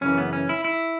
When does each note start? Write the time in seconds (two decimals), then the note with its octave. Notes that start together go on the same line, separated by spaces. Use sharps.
0.01 F#2 C#3 E3 C#4
0.18 B3
0.33 C#4
0.49 E4
0.65 E4